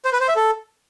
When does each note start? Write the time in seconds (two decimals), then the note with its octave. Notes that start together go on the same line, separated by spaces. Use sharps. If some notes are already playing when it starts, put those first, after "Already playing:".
0.05 C5
0.13 B4
0.21 C5
0.28 E5
0.36 A4